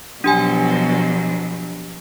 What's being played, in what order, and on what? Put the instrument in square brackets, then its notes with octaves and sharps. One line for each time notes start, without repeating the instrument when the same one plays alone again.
[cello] B2 F3 [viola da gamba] F#3 [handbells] D4 G4 G#5